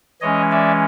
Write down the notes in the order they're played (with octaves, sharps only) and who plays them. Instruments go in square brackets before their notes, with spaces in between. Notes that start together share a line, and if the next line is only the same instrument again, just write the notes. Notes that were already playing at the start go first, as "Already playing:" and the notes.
[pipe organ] E3 G#3 C#4 C#5 D#5
D5 E5